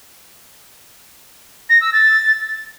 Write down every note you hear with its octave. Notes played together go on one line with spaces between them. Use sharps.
A#6
E6
A6